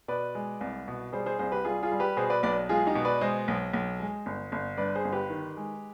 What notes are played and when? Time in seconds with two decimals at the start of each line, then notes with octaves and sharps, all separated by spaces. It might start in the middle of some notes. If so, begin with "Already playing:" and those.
0.08 B2 B4 D5
0.35 G#3
0.61 C2
0.88 B2
1.13 G3 G#4 C5
1.26 G#4 C5
1.39 C2 G#4 C5
1.52 G4 B4
1.65 G3 F4 G#4
1.83 F4 G#4
1.92 G3
2.00 G4 B4
2.17 B2 G#4 C5
2.30 B4 D5
2.43 B1 B4 D5
2.69 G#3 F4 G#4
2.86 D#4 G4
2.95 B2
3.05 B4 D5
3.21 G#3 C5 D#5
3.48 B1
3.74 B1
4.00 G#3
4.26 G1
4.52 G1
4.77 G2 B4 D5
4.96 G#4 C5
5.05 G1
5.13 G4 B4
5.30 D#3
5.57 G#3